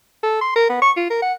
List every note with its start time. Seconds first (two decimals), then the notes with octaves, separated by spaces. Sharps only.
0.23 A4
0.41 C6
0.56 A#4
0.69 B3
0.82 C#6
0.97 F4
1.10 A#4
1.22 F#5